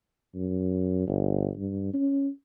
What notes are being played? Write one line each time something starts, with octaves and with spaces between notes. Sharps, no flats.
F#2
G1
G2
C#4